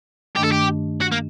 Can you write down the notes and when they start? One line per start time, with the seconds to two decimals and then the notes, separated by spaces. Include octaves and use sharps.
0.36 G2 D#3 A3 D4 G4
0.44 A4
0.52 G4
1.01 F#4
1.12 A#3